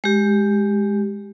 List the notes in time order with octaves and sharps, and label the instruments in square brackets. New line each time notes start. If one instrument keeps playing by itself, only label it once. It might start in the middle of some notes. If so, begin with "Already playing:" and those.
[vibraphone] G#3 G4